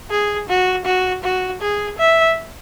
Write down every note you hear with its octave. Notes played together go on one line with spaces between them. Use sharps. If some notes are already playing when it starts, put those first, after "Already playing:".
G#4
F#4
F#4
F#4
G#4
E5